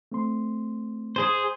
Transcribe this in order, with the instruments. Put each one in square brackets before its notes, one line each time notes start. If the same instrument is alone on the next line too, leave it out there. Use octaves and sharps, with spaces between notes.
[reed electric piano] A3 C4 C6
[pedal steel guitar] G#4 C5